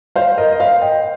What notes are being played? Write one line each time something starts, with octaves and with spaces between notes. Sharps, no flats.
C5 F5
A#4 D#5
D#5
C5 F5
D#5 G5